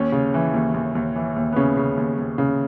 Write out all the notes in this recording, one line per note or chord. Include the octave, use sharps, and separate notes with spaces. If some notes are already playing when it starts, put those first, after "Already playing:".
Already playing: D#2 C#4
C#3
E3
D#2
D#2
D#2
E3
D#2
B3
C#3 C#4
C#3
D#2
D#2
C#3